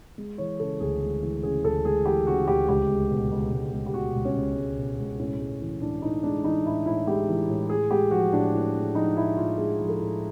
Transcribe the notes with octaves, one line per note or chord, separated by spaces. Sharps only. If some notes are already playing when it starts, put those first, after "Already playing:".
G#3
E3 C#5
C#3 A4
D2 G#4
G#3
E3
C#3 G#4
D2 A4
G#3 G#4
E3 G4
C#3 F#4
D2 G4
C#2 G4
G#3
B2
C#2
C#2
G#3
G4
B2 F#4
C#2
C#4
C#2
G#3
B2
C#2
A2 C#4
G#3
E3
A2 D4
A2 D#4
G#3 D4
E3 D#4
A2 E4
A2 E4
G#3 G4
E3
A2
A2 G#4
G#3 G4
F3 F#4
A2 D4
A2
G#3
F3 D#4
A2 E4
A2 F4
G#3 G#4
F3
A4
A2